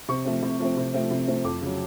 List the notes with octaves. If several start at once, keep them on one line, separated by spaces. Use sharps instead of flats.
C3 C#6
F3 A3 C4
C3
F3 A3 C4
C3
F3 A3 C4
C3
F3 A3 C4
F2 D6
C#3 F#3